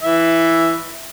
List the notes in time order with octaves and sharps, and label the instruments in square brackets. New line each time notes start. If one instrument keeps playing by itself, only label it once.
[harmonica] E3 E5